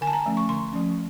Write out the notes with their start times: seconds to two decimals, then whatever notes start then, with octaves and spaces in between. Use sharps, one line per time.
0.01 D3 G#5
0.07 A5
0.13 A#5
0.26 F3 A3 C#4
0.37 C#6
0.49 D3 C6
0.73 F3 A3 C#4